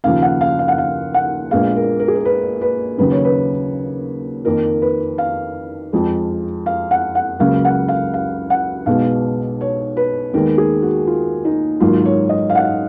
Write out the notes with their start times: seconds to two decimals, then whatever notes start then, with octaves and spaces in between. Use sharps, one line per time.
0.04 D#2 C#3 F3 F5
0.22 F#5
0.41 F5
0.59 F5
0.68 F#5
0.78 F5
1.14 F#5
1.51 A#1 A#2 G#3 B3 F5
1.76 A#4
2.00 A#4
2.08 G#4
2.15 A#4
2.25 B4
2.61 B4
2.98 D#2 C#3 F#3 B4
3.11 C#5
3.25 B4
4.45 F2 D#3 A#3 A#4
4.82 B4
5.18 F5
5.93 F2 F3 G#3
6.66 F5
6.91 F#5
7.15 F#5
7.39 C#2 C#3 F#3 A#3 F5
7.65 F#5
7.88 F5
8.14 F5
8.50 F#5
8.86 B1 B2 G#3 B3 F5
9.61 C#5
9.97 B4
10.34 D#2 D#3 G#3 B3 A#4
10.58 G#4
10.82 F#4
11.07 F4
11.45 D#4
11.80 G#1 G#2 F#3 A#3 F4
12.05 C#5
12.29 D#5
12.50 F5
12.55 F#5